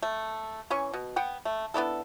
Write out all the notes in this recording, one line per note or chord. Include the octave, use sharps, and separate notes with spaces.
A3
E3 C#4 G#5 C#6
B2
B3 F#5 G5
A3
B3 D4 E4 A4